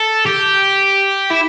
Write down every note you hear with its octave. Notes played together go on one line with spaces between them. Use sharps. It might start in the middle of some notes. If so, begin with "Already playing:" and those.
Already playing: A4
G4
E4